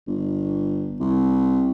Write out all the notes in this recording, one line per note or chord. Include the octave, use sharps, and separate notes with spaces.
G1
C2